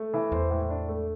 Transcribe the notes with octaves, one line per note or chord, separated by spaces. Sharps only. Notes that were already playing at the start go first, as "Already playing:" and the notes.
Already playing: A3
E3
E2 C5
A2
D4
A3